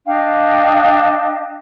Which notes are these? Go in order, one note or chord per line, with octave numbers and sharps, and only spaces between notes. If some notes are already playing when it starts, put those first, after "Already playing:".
D4 D#5 F5 G5